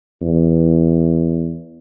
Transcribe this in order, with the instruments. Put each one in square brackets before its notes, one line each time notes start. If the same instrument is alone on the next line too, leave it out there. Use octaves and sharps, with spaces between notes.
[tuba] E2